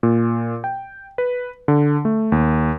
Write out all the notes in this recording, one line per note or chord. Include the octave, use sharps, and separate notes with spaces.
A#2
G5
B4
D3
A3
D#2